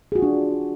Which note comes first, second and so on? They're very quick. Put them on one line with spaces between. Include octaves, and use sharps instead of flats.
G#4 F#4 F4 D4